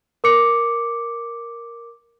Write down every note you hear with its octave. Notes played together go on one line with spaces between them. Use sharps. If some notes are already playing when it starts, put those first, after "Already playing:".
A#4 D6 C#7